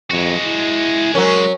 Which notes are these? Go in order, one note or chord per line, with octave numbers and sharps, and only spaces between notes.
F2 G#3 F#4
E4
F#3 C#4 A#4